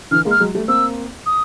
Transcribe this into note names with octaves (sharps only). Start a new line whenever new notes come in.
D3 E3 F6
G#3 A#3
F6
F#3 G#3
G3 A3
A#3 C4 E6
D#6